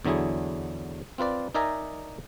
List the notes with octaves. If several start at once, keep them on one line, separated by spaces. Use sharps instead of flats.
E2 D3 F#3 E4 G#4
C4 F4 B4 D5
D#4 A#4 D5 E5 G#5 A#5